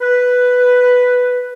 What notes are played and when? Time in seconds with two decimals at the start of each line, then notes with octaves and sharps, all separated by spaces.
0.01 B4